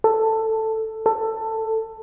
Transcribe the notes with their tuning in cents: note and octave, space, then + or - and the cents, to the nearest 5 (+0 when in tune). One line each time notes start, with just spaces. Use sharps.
A4 +10
A4 +15